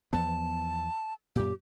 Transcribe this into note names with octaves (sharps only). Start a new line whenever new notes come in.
E2 F3 B3 A5
F#2 A#2 G4